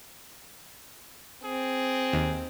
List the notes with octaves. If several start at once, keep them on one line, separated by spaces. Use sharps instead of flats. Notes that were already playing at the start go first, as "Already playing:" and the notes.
C4 G#4
D#2